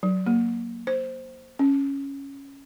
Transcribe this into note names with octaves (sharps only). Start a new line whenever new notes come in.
F#3
A#3
C5
C#4